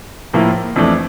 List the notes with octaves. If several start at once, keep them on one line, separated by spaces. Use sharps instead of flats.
A2 F3 A#3 E4
F2 E3 A3 D4